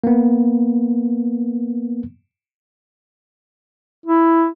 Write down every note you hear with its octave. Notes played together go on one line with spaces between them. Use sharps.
A#3 B3
E4